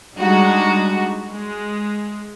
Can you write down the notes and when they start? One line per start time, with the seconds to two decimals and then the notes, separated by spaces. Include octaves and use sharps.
0.17 G3 G#3 D4 D#4 F#4
1.31 G#3